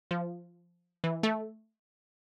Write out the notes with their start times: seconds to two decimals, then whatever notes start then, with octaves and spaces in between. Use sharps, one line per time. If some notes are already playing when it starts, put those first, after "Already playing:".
0.11 F3
1.04 E3
1.23 A3